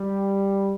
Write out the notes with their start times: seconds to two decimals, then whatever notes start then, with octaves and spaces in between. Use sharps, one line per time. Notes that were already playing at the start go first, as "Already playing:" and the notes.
Already playing: G3